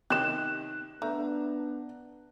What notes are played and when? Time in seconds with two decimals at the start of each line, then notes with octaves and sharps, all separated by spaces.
0.10 C3 D#3 G4 D#5 F#6 E7
1.02 A3 B3 D4 A#5